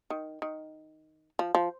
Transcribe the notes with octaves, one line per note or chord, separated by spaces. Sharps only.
D#3
D#3
F3
F3